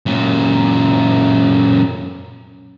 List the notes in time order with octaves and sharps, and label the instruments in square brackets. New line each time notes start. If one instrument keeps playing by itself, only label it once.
[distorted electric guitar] F#2 A#2